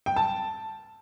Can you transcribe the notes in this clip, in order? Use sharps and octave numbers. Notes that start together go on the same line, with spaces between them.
G5
A5